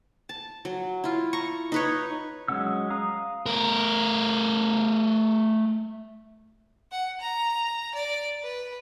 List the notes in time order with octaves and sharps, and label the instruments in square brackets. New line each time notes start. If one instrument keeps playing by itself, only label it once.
[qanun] A5
F#3
E4 F4
A#5 C#6
D#4 B4 C#5
[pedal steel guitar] F#3 G#3 C#4 F#5 E6
F5 A#5 D#6
[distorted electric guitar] A3 A#4
[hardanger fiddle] F#5
A#5
D5
B4